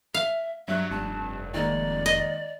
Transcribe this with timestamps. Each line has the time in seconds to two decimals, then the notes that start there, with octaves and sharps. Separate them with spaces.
0.14 E5 F5
0.68 G2 F#3 E5 F#6
0.91 F1 G2 A5
1.54 D#3 G#3 A#3 D5
2.06 D#5